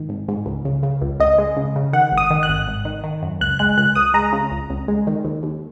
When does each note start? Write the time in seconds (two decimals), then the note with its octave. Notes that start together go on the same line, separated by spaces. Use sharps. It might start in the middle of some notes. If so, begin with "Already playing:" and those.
Already playing: G#2 D#3
0.09 G#1
0.28 G#2
0.46 C#2
0.65 C#3
0.83 C#3
1.01 C#2
1.20 C#2 D#5
1.38 G#3
1.57 C#3
1.76 C#3
1.93 D#3 F#5
2.12 G#1
2.17 D#6
2.31 D#3
2.43 F#6
2.49 G#1
2.68 G#1
2.85 D#3
3.04 D#3
3.22 F#2
3.40 C#2 F#6
3.59 G#3 F#6
3.78 C#2 F#6
3.95 C#2 D#6
4.14 G#3 A#5
4.33 C#3
4.51 C#2
4.70 C#2
4.88 G#3
5.07 D#3
5.25 D#2
5.43 D#2